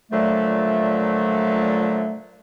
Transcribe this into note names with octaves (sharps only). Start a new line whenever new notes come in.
A#2 D3 F3 F#3 A3